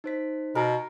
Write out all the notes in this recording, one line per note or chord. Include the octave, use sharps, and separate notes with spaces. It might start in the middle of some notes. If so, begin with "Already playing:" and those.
D#4 C5 B6
B2 A#4